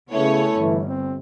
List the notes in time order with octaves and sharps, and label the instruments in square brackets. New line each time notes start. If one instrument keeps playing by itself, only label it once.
[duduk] C#3 [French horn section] A3 E4 [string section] B3 C#4 C#5
[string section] G1 [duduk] E3
[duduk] C4